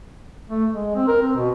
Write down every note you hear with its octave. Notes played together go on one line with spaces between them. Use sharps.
A3
G#3
C4
A#4
C4
B2